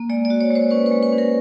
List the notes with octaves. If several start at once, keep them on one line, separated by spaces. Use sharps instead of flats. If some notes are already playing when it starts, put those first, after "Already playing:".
Already playing: A#3
G#3 D5
D5
F#4
C#5
G#3 C5
C#4 B4
B4
G#3
B4
C#4
A#4